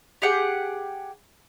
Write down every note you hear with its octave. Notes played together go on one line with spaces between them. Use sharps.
G4 G#4 F#5 G5